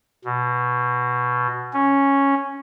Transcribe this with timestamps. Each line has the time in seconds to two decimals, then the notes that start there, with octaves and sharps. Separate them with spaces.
0.25 B2
1.73 C#4